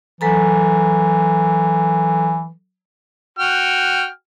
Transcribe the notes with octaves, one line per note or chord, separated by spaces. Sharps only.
E3 F#3 A4 A#5
F#4 G5 F6